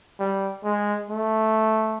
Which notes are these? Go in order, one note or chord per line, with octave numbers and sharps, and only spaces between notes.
G3
G#3
A3